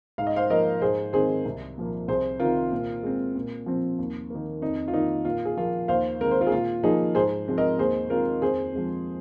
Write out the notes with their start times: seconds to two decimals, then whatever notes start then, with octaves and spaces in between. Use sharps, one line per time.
0.18 G#2 F5
0.27 D#5
0.36 C5 F5
0.50 F3 A#3 A#4 D#5
0.82 G#2 G#4 C5
1.13 D#3 G#3 C4 G#4 C5
1.45 C2
1.77 A#2 F3 A#3
2.08 C2 G#4 C5
2.40 C3 D#3 C4 F4 A#4
2.72 A#2
3.03 G#3 C4
3.36 A#2
3.66 F3 C4
3.99 D#2
4.30 D#3 A#3
4.61 F2 D#4
4.88 F4
4.93 D#3 A#3 D#4
5.25 A#2 F4
5.45 G#4
5.57 F3 A#3 F4
5.88 D#2 C5 F5
6.20 D#3 G#3 C4 A#4
6.31 C5
6.41 F4 A#4
6.47 G#4
6.51 A#2 F4
6.83 F3 A#3 D#4 G#4
7.15 G#2 G#4 C5
7.48 F3 G#3 C4
7.58 A#4 D#5
7.78 D#2 G#4 C5
8.10 D#3 G#3 C4 F4 A#4
8.42 F2 G#4 C5
8.73 F3 G#3 C4